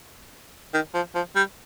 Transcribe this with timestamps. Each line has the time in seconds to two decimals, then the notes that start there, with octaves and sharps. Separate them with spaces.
0.74 D#3
0.94 F3
1.15 F3
1.36 G3